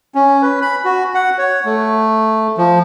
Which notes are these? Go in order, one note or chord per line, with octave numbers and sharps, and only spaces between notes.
C#4
B4
B5
F#4
F#5
C#5
A3
F3